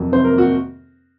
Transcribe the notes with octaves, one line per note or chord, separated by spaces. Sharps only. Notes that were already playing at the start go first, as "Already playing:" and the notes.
Already playing: F2 C3 F#3 A#3
C3 C5
A#4
A#3
F#4